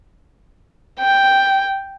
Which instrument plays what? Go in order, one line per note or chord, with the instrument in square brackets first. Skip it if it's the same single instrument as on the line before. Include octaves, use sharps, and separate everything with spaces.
[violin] G5